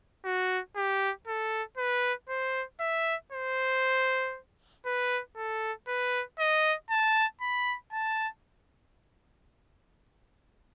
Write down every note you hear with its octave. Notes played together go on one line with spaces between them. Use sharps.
F#4
G4
A4
B4
C5
E5
C5
B4
A4
B4
D#5
A5
B5
A5